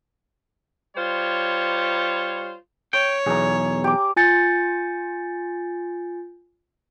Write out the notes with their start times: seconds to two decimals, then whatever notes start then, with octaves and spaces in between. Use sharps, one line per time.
0.96 G3 F4 C5 C#5
2.93 C#5 G5
3.26 B1 E2 G#4 A#5
3.84 G4 D6
4.16 F4 G#5 G6 A6 C#7